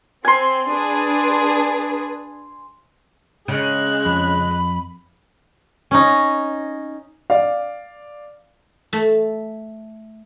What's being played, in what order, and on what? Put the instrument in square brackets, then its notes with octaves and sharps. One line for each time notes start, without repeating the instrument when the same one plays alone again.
[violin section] C4 [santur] G#5 C6
[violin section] D4 G#4 B4
[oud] C#3 [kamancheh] G#3 F#6
[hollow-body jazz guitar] F2 [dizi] B5
[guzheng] C#4 D#4
[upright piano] D5 F5
[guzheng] A3